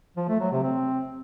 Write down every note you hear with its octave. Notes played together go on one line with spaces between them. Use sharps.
F3
A3
F#3
C3
C4